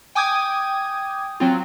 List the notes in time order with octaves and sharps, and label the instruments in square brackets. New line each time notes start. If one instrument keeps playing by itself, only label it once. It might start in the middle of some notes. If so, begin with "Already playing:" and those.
[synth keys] G5 G#5 D6 D#6 G6 G#6
F#3 C4 F4